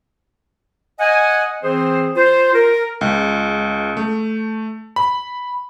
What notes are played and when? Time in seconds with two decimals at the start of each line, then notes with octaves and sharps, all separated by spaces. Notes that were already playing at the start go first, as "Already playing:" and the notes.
0.99 D#5 F#5 G#5
1.63 E3 C4 G#4 C5
2.16 F4 C5
2.54 A#4
3.01 C#2
3.97 A3
4.96 B5